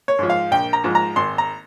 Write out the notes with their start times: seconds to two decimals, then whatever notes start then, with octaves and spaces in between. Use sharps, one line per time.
0.08 C#5
0.19 G#2 F3
0.30 F5
0.51 A#1 G5
0.73 A#5
0.84 G#2 F3
0.95 A#5
1.16 G#1 C6
1.38 A#5